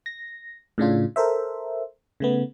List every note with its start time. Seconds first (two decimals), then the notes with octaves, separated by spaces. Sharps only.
0.06 A#6
0.78 A2 C#3 D4 F4
1.16 A4 A#4 C5 E5
2.20 C#3 A3 B3